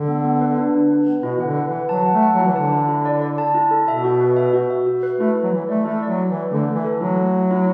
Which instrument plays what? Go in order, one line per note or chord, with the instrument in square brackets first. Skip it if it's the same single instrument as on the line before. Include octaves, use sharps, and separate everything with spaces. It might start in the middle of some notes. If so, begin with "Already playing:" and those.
Already playing: [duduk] D3
[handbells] B3
B3
B4
D4
D4
B4
B3
[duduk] B2 [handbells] E4
[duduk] E3 [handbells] F#5
[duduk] D3
[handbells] B4
[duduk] E3
[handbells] F#5
[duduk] F#3 [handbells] A5
[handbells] F#5
[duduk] A3
[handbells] F#5
[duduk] F#3
[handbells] E4
[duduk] E3
[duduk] D3 [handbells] A5
[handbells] E4
E4
D5
D5
A5
E4
A4
[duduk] B2 [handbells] E5
[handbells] F#4
B4
E5
F#4
E5
F#4
B4
[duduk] A3 [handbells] E4
[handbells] E4
[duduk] F#3
[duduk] E3 [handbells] E4
[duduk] A3 [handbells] D5
[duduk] A3 [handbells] E4
[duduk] F#3 [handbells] D5
[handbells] D5
[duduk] E3
[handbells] D5
[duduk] D3 [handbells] A3
[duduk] E3 [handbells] A3
[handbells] A4
[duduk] F#3
[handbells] E4
A3
A3
E4